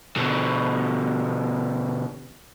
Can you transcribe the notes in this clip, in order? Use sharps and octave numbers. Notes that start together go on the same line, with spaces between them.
B2 D3